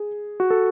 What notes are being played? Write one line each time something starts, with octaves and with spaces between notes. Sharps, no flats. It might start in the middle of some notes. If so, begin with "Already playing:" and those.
Already playing: G#4
F#4
A4